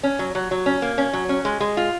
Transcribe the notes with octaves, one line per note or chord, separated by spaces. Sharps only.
C#4
F#3
F#3
F#3
C#4
A#3
C#4
F#3
C#4
G#3
G#3
F4